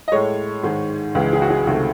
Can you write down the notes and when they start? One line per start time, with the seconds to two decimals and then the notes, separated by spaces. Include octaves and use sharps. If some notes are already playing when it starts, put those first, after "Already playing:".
0.08 D#5
0.12 A2 G#3 C#5
0.63 G#2 D#3 G#3
1.15 C#2 C#3 E3 G#3
1.33 G#4
1.42 F#4
1.50 G#4
1.67 C#2 C3 D#3 A3 F#4